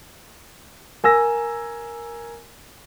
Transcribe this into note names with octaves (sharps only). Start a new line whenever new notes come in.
A#4 G#5 E6 A#6